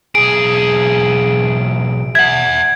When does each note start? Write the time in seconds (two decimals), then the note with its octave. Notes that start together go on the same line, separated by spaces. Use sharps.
0.15 B1 G#4 D7
2.15 E5 F#5 G#6